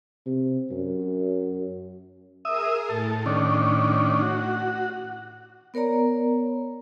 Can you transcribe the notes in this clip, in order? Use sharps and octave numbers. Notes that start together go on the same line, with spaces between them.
C3
F#2
G#4 A#4 E5 D#6
A2 A4
D#3 C#4 D4
F#4
B3 A#4 C#5 D5 A#5